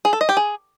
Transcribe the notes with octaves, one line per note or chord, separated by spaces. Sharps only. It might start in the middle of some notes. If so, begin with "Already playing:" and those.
G#4
A4
D#5
G4
G#4